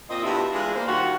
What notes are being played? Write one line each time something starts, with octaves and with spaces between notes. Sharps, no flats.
A#2 C4 C5 D#5
G2 B2 G3 A3 E4 F4
E3 G#3 D4 F4
A#3 C5
D#3 G3 F4 F#4